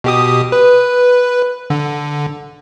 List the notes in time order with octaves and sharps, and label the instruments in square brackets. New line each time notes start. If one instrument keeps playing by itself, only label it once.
[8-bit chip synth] B2 G4 D#6
B4
D3